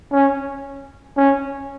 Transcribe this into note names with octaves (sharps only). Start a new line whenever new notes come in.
C#4
C#4